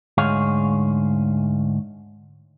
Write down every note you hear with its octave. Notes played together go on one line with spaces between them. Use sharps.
D2 G#2 G#4 C#5 F5